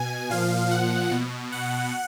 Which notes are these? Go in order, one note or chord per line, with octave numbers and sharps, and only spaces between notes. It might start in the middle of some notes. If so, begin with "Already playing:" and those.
Already playing: B2 G#5
A#2 F3 F5
F#5
B2
F#5